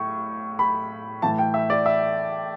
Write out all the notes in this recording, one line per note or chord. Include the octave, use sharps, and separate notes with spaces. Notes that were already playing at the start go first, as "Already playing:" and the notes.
Already playing: A2 C#6
B5
A2 E3 A5
G5
E5
D5
E5